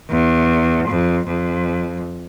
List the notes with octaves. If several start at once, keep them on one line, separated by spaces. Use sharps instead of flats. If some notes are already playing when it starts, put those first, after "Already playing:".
E2
F2
F2